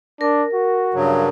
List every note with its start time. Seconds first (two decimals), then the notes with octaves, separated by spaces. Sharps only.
0.21 D4 A#4
0.54 F#4
0.94 G2 C#3 F#3